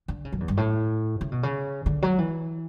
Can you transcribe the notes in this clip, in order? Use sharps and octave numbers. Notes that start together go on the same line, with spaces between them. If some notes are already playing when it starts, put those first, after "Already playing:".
D3
C#3
F#2
E2
G2
A2
C#3
B2
C#3
D3
F#3
E3